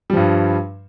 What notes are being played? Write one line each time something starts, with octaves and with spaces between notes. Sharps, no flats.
G2 F3 G3